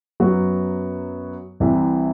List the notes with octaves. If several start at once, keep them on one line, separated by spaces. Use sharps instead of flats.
F#2 F#3 B3 F#4
C2 C3 E3